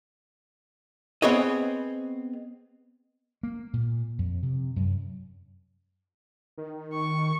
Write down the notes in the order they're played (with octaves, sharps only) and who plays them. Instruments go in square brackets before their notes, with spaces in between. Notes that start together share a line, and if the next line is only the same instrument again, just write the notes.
[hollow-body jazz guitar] B3 C4 G#4 C#5 D#5
[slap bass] A#3
A#2
F2
C3
F#2
[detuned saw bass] D#3
[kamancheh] C#6